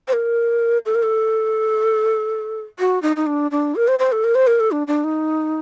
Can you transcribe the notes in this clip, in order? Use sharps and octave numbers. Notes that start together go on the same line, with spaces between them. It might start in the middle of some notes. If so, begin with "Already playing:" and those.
C5
A#4
A4
A#4
A4
F#4
D#4
D#4
D4
D4
A#4
C5
C5
A4
A#4
C5
A#4
A4
D4
D4
D#4